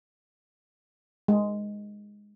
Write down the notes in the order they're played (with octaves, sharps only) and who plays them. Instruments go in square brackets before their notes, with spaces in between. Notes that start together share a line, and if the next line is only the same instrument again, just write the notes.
[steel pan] G#3